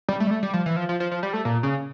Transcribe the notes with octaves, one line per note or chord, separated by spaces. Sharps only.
G3
A3
G3
A3
G3
F3
E3
F3
F3
F3
F3
G3
A3
A#2
C#3